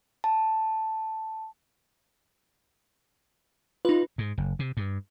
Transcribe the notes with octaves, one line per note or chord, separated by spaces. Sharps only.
A5
D#4 F4 B4
G#2
F#1
C3
G2